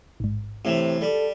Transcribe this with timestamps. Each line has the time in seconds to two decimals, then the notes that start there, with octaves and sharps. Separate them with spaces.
0.20 A1 G#2
0.65 A2 C3 E3
1.01 G3 A4